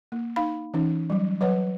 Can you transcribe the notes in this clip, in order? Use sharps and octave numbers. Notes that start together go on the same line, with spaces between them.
A#3
D#4 F5 B5
E3 C#4 D#4
F#3 G3
F#3 B4 C#5 F#5